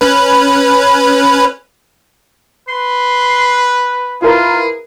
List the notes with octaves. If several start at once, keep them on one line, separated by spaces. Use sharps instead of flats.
C#4 B4
B4 C6
E4 F4 G#4 A#4 B4